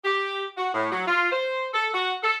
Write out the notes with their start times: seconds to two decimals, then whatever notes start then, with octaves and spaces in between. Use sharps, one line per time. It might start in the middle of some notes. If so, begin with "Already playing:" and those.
0.04 G4
0.57 F#4
0.74 A2
0.91 F#3
1.07 F4
1.32 C5
1.74 A4
1.93 F#4
2.23 A4